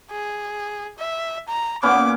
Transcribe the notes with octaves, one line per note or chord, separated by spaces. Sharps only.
G#4
E5
A#5
A#2 B3 C#4 D6